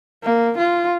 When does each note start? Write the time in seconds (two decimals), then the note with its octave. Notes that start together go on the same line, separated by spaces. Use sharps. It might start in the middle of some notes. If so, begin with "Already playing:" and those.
0.24 A#3
0.58 F4